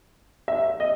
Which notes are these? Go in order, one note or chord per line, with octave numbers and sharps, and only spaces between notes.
E5
D#5